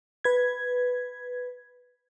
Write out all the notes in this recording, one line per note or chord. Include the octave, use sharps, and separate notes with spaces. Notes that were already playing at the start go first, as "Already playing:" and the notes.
B4 G#6